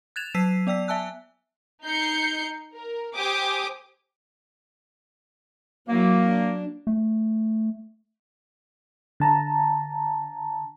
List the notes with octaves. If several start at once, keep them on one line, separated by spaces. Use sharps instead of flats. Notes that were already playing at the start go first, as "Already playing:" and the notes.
F#6 G#6 A6 E7 F7
F#3 E6 B6 C7 D#7
B3 D5 G5 E6 B6
E5 G#5 A5 E6 F#6
D#4 G6 C7 C#7
A#4
G4 C5 G#5 D6 D#6
F#3 A#3 E4
D4
A3
D3 A5 A#5